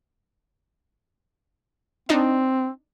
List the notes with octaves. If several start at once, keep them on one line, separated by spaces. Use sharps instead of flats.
C4 D4 D#4 D#5